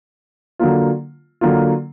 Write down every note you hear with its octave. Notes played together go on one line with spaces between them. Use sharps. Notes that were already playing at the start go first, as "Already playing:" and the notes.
D3 F#3 A#3 F4
D3 F#3 A#3 F4